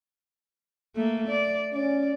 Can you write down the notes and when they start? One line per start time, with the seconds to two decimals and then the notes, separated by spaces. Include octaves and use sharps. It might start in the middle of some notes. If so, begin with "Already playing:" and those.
0.96 A3 A#3
1.28 D5
1.74 C#4 D5